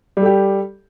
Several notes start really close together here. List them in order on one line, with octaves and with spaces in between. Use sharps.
G3 A4 G4